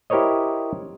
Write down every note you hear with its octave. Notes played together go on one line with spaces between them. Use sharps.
E4 G4 A#4 C5 C#5 D#5